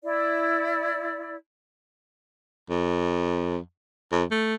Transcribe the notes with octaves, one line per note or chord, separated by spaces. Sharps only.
E4 D5
F2
F2
A3